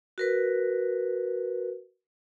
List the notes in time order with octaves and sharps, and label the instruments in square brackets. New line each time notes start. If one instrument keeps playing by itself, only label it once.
[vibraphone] F#4 A#4 B4